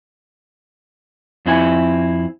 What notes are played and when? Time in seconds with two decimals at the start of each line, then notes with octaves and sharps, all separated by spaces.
1.46 F2 C4 E4 G#5